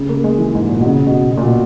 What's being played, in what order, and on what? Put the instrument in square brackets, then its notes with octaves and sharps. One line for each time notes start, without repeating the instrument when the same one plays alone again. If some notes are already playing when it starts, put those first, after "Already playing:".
Already playing: [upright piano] C#3
A#3
G#3
E3
G#2
A#2
B2
C#3
B2
B2
A#2
B2